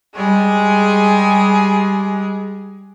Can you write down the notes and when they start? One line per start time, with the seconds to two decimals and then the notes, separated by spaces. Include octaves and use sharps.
0.16 G3 G#3 G#4